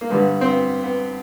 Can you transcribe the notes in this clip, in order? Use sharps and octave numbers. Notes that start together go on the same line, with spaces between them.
A#3
G2 D3 G3 B3
C4
B3
B3